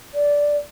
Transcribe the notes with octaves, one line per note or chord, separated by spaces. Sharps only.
D5